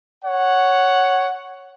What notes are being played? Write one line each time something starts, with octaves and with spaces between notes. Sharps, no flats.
C#5 F#5